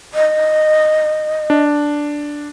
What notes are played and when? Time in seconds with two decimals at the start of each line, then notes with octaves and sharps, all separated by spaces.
0.14 D#5
1.50 D4